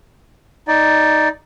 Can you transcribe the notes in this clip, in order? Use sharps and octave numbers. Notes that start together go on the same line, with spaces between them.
D#4 D5